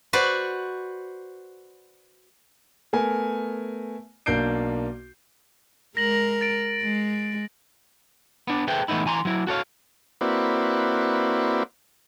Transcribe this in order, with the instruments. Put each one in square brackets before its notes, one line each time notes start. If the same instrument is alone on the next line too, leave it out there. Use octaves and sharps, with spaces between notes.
[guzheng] F#4 B4 C5 D5 F#5
[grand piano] A3 B3 A#4 G#5
B1 A#3 D4 G6 C7 D7
[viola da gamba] G#3 A#4 [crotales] A#6 F#7
[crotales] A6 D7
[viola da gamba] G#3
[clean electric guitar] B3 D4
G#4 A4 B4 C5 E5 G5
E3 A3 B3 D#4 E4
E3 G#5 A#5 C6
F#3 E4
F#4 A4 C#5 F5
[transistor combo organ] A#3 C4 E4 F#4 B4 D5